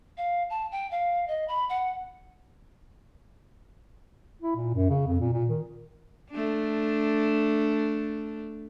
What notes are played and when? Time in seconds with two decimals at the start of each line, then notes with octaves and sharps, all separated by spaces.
0.18 F5
0.50 A5
0.72 G5
0.91 F5
1.28 D#5
1.48 B5
1.70 F#5
4.42 E4
4.56 A#2
4.74 F#2
4.90 C#3
5.08 F2
5.20 A#2
5.34 A#2
5.50 D#3
6.31 A3 D4